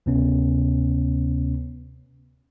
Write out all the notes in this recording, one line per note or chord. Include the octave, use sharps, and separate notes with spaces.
D2 C3 B3 C#4